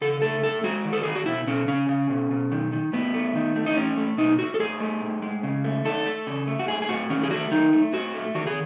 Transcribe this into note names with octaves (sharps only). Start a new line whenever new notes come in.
C#3 A4
A3 A4
A2 A4
G#3 F#4
D#3
A4
D#3 G#4
F#4
B2 E4
B2 C#4
C#3 C#4
C#3
B2
B2
D#3
D#3
A2 B3
A3
D#3
A3
D#4
A2 C#4
A3
B2 D#4
A3 F#4
A4
A2 G#4
A3
A2
G#3
C#3
A3
D#3 A4
A3
C#3
A3
F#4
A2 G#4
G#4
A2 F#4
D#3 C#4
G#4
A3 F#4
D#3 D#4
A3
A2 F#4
A3
D#3 F#4
G#4